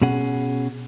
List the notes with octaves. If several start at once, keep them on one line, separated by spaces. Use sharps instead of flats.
B2 C#4 G#4 F#5